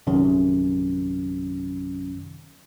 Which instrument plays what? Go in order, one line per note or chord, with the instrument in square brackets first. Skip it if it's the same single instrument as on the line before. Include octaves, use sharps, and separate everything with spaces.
[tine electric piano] A#1 F#2 C3 D#3 F#3 C#4